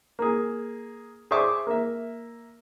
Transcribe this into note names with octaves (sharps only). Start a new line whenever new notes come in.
A#3 G#4
G#4 C5 D5 E5 C#6 D6
A#3 E5